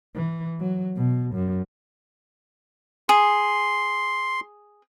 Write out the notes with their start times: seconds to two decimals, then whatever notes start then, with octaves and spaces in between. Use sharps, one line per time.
0.15 E3
0.60 F#3
0.96 B2
1.35 F#2
3.09 G#4 C6